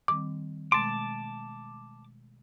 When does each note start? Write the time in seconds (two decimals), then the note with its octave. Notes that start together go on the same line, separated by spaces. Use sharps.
0.08 D#3 G3 C4 D6
0.72 B2 G#3 A3 A5 C6 D6